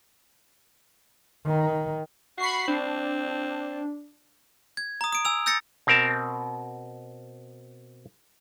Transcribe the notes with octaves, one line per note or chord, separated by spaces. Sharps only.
D#3
F#4 B5 C#6 C7
C4 D4
G#6
A#5 D#6
D#6 D7
G#5 E6 F7
E6 G6 A6 A#6 C#7
B2 C4 A#4 A5